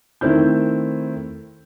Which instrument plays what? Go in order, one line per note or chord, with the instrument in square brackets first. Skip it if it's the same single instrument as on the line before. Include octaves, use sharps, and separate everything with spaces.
[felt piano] D#3 A3 C4 E4 G6